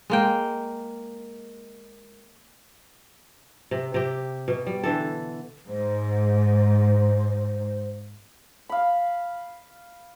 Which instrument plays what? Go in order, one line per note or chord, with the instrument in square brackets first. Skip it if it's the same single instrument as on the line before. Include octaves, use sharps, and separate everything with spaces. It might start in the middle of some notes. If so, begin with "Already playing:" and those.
[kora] G#3 A#3 G5
C3
C3 G4
B2
G3
D3 E3 A4
[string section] G#2 [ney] C5
[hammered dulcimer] F5 B5